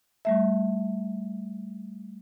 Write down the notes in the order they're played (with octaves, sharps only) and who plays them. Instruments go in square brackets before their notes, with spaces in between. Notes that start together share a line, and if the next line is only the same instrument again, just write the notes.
[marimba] G3 A3 E5